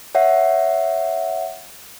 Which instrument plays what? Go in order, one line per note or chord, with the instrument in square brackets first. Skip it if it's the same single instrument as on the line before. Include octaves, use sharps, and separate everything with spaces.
[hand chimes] C#5 E5 F#5